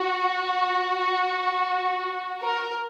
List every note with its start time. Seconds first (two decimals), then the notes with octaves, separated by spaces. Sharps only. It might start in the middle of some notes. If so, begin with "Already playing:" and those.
Already playing: F#4
2.42 A#4